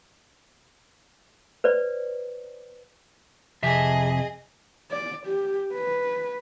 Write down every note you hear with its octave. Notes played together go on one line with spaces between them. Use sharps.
B4 C5 D5
F2 C3 G#4 D#5 E5
D5
G4
B4